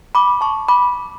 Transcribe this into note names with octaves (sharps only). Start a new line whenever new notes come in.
B5 D6
A5 C#6
B5 D6